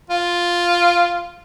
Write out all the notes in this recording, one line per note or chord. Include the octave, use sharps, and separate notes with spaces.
F4